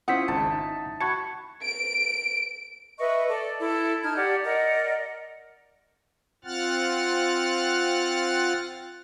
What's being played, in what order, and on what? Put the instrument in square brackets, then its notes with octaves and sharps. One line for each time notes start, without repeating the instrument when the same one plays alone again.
[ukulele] C#4 E4 F#5 [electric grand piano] F4 C5 [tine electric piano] D#6 G6 B6
[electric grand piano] G#1 C#2 G#2 [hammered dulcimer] A5
[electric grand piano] D#4
[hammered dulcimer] F#4 [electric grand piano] A5 B5 F#6 [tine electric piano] C#6 G#6 C#7
[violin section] D7
[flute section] B4 D#5 E5 C#6
A4 D5
E4 A4
D#4 A5 F6 G#6
G4 D5 F#5
A#4 D5 D#5 F#5
[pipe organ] C4 F4 F#5 F6 F#6 A6